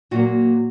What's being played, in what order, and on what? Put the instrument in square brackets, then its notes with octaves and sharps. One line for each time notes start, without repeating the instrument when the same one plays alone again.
[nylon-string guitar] A#2 F#3 A#3 F#4